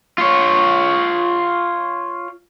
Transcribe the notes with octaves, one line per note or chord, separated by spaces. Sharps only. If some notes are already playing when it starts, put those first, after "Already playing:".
F4 C#5